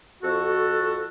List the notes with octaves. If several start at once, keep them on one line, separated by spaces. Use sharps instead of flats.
F2 F#4 A4